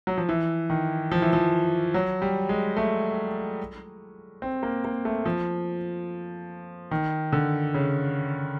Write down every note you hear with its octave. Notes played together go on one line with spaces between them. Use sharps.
F#3
F3
E3
D#3
F3
E3
F3
F#3
G3
G#3
A3
C4
A#3
A#3
A3
F3
D#3
D3
C#3